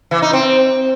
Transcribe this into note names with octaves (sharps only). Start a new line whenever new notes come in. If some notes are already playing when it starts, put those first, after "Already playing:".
E3
D#4
C4